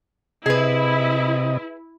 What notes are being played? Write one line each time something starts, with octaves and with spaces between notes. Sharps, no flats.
C3 E4 G#4 B4 D#5